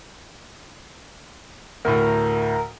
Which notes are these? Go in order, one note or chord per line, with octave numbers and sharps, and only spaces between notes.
D2 A2 A#4